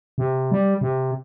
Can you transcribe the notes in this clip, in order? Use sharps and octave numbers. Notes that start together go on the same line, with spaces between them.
C3
G3
C3